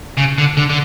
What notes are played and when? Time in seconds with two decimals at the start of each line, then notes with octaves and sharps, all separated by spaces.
0.18 C#3
0.38 D3
0.57 D3
0.70 D3